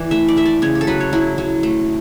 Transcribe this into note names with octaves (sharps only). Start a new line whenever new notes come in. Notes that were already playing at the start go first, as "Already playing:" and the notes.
Already playing: E3 D5
A3 E5
D5
A3 E5
D5
C#3 C#5
G4
A4
F#3 B4
C#5
F#3 E4
F#3
A3